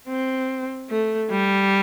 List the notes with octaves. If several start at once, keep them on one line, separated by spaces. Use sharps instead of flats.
C4
A3
G3